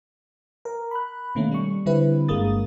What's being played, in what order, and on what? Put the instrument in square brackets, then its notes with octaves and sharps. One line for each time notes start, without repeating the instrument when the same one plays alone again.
[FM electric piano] A#4
B5 F#6
B2 D#3 A3 A#3 C#4
G3 C#6
D3 G3 C4 E4 B4
G1 G2 G#3 A#3 D#6 A6